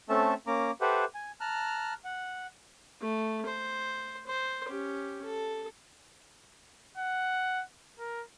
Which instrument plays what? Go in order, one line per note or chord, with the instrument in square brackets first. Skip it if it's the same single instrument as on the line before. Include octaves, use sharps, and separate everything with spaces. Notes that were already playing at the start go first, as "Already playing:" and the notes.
[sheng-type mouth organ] A3 C4 C#4 A4 E5 A5
A#3 C#4 A#5 D6
G4 A4 B4 C5 E5 F#5
G#5
A5 A#5 F6 F#6
F#5
[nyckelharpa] A3
C5
C5
C#4 G4
A4
[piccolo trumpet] F#5
A#4